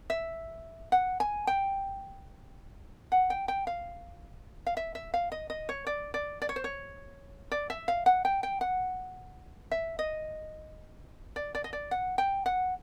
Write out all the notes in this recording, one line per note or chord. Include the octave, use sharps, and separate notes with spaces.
E5
F#5
G#5
G5
F#5
G5
G5
F5
F5
E5
E5
F5
D#5
D#5
C#5
D5
D5
D5
C#5
C5
C#5
D5
E5
F5
F#5
G5
G5
F#5
E5
D#5
D5
D5
D#5
D5
F#5
G5
F#5